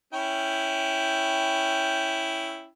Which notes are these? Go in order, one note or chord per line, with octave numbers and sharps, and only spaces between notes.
C#4 E4 G5